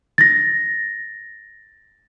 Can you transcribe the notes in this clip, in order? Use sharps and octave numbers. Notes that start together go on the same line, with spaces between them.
A6 A#6